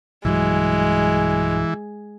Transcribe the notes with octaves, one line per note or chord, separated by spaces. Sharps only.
B1 G2 E3 F#3 G#3